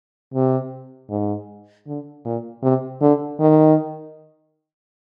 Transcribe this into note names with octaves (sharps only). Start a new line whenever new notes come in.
C3
G#2
D3
A#2
C3
D3
D#3